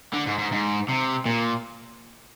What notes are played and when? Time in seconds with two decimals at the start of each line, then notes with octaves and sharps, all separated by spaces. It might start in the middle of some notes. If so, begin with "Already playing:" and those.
0.13 D3
0.26 G#2
0.38 G#2
0.52 G#2
0.89 C3
1.26 A#2